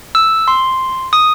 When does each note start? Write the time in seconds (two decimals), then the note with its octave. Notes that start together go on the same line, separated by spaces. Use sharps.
0.15 E6
0.48 C6
1.13 D#6